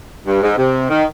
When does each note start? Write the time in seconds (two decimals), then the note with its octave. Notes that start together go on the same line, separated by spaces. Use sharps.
0.25 G2
0.42 G#2
0.58 C3
0.90 D#3